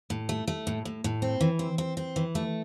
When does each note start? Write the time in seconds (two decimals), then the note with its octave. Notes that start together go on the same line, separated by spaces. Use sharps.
0.10 A2
0.29 A3
0.47 A3
0.67 A2
0.85 A2
1.04 A2
1.22 C4
1.41 E3
1.59 C4
1.78 C4
1.97 C4
2.16 E3
2.35 A3